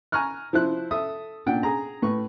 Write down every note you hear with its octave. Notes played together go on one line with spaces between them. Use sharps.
G#5 A#5 C#6 F6 F#6
F3 E4 C5 F#6
A4 E5 D#6
A#2 D4 F#5 G5
G#4 A#5
A2 B4 C#6